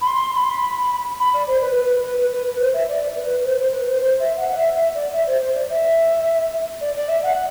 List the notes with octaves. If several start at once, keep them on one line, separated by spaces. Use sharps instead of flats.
B5
C6
B5
C6
B5
B5
D5
C5
B4
B4
B4
B4
B4
C5
E5
D5
B4
C5
C5
B4
C5
C5
E5
F#5
D5
E5
E5
D5
E5
C5
C5
D5
E5
D5
D5
E5
F#5